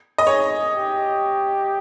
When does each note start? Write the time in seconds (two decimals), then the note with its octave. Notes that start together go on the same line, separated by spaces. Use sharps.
0.18 D#5
0.27 G#4 C#5
0.74 G4